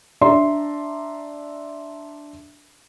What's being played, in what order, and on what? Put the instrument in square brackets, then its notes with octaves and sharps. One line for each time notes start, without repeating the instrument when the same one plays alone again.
[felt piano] D4 D5 E5 A#5 C6